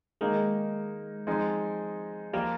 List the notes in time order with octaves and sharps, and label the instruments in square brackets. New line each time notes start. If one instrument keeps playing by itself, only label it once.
[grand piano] D#3 A#3 D#4 A#4 [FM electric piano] G#3
[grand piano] F3 G#3 C4 D#4
[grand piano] F3 A#3 F4 A#4 [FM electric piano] G3